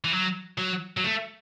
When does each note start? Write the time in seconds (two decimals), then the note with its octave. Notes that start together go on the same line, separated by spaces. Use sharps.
0.04 E3
0.12 F#3
0.58 F#3
0.97 F#3
1.04 A3